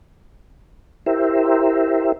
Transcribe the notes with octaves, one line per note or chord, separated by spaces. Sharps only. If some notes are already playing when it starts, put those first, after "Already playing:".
E4 G4 A#4 C5 E5